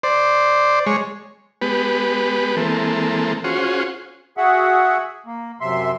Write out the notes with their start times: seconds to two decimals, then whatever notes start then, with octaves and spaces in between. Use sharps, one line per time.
0.03 C5 D5
0.86 G#3 C#5
1.62 G#3 B3 G4 B4
2.57 E3 G#3 A#3 C4 A4
3.44 C#4 F4 F#4 G#4 C5
4.37 F#4 G#4 E5 F#5
5.26 A#3
5.61 F#2 C3 E5 C6